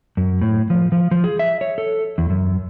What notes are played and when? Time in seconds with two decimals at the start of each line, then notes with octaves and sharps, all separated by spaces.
0.17 F#2
0.41 A2
0.70 F3
0.92 F3
1.11 F3
1.24 G#4
1.39 E5
1.61 C#5
1.78 A4
2.18 E2
2.30 F#2